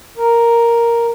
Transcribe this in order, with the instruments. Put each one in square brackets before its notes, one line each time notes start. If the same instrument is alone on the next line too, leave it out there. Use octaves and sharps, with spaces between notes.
[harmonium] A#4